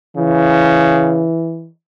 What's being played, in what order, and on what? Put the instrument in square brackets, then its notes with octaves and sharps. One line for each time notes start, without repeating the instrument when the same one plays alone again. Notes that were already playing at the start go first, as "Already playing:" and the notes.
[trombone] C#3 [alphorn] E3